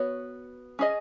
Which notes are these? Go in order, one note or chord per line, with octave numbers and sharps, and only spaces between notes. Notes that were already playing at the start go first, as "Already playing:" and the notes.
Already playing: B3 F#4 C#5
C#4 G#4 D#5